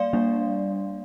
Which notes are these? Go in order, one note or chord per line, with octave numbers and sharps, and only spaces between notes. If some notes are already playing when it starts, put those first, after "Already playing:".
Already playing: G3 A#3 D5 F5 C6
G3 A#3 D4